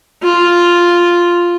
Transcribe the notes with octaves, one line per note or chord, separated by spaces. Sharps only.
F4